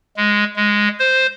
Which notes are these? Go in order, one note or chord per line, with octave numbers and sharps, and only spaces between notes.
G#3
G#3
C5